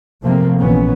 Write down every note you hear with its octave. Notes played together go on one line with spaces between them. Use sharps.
C3 F3 A3 A#3 C4
A#1 A#2 E3 B3 C#4